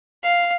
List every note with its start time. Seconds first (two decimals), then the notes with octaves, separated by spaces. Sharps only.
0.23 F5